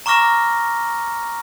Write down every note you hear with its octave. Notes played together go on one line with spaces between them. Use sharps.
A#5 C#6 D6 F6 A#6 G7